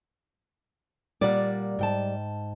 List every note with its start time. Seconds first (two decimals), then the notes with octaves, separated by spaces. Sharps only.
1.21 A#2 G3 A#3 D5 F#5
1.79 G#2 G5 A5